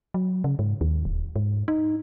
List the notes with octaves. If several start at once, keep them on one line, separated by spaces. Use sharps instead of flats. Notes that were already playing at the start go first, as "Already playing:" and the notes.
F#3
C#3
G#2
D#2
D1
G#2
D#4